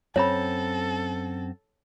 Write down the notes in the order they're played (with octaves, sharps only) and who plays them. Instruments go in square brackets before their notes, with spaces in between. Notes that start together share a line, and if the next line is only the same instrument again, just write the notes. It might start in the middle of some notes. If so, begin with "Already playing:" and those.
[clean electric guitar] F#2 C4 [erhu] A4 [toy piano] C#5 B5